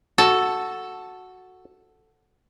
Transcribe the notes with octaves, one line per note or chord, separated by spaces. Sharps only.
F#4 A4